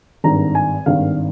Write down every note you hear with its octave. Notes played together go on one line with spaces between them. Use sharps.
G#1 G2 D#3 A#5
G#5
G#1 G2 D#3 F5